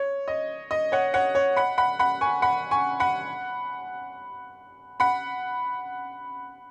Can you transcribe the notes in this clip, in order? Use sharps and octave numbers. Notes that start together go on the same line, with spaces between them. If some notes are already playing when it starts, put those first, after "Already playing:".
Already playing: C#5
D#5
D#5
C#5 F#5
C#5 F#5
C#5
F#5 B5
F#5 B5
F#5 B5
G#5 C#6
F#5 B5
G#5 C#6
F#5 B5
F#5 B5